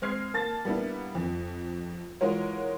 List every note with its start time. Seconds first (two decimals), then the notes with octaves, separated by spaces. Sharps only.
0.02 G#3 C4 F6 G#6 C7
0.34 A#3 A5 A6
0.65 G3 A#3 B3 D4 E4
1.15 F2
2.21 E3 G#3 F4 F#4 A#4 C#5